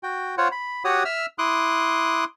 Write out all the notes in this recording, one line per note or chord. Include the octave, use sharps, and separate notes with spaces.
F#4 G5
F4 C5 C#5 F#5
B5
F#4 G4 C#5 F#5 D#6
E5 E6 F6
E4 C6 D6 D#6 F#6